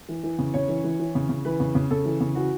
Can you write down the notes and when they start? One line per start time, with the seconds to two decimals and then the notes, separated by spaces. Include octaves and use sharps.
0.09 E3
0.23 E3
0.39 C#3
0.54 C#3 C#5
0.68 E3
0.84 E3
0.99 E3
1.15 C#3
1.29 C#3
1.45 E3 B4
1.60 C#3
1.75 C#3
1.91 C#3 A4
2.05 E3
2.21 C#3
2.36 E3 F#4